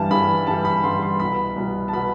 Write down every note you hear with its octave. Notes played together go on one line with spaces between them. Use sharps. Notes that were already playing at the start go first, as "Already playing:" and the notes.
Already playing: G2 E3 G3 A5
G2 E3 G3 B5
G2 E3 G3 A5
B5
G2 E3 G3 C6
C6
C2 B2 B3 B5
C2 B2 B3
A5
B2 B3 B5